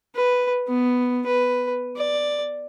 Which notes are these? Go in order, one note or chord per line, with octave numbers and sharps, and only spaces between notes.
B4
B3
B4
D5